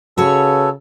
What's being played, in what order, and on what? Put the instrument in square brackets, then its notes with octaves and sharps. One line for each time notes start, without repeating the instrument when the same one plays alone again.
[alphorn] C#3 [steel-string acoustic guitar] F#4 B4 C#5 [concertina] A4